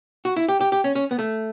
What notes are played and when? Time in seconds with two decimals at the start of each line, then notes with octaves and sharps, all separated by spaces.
0.25 F#4
0.36 E4
0.48 G4
0.61 G4
0.72 G4
0.84 C#4
0.95 C#4
1.11 B3
1.19 A3